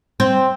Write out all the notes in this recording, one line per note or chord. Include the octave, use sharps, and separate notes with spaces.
C4